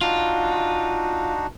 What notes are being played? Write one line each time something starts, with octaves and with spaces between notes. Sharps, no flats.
D4 D#4 F4 F#4